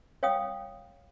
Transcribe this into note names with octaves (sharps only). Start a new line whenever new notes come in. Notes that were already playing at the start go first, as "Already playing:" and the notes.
C#5 F5 G5 D#6